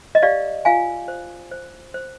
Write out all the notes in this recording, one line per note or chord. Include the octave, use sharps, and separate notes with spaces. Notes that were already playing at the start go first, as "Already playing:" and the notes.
D#5
G4 D5 F5
F4 F5 G#5
C5
C5
C5